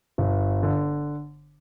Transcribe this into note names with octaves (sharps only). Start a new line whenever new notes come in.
G1
D3